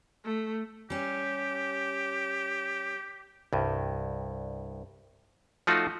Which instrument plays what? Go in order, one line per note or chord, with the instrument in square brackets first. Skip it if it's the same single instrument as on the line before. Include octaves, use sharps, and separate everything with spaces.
[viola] A3
[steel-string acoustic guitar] G3 C#4 [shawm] G4
[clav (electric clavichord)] C2 G2
F3 A3 D#4 F4 F#4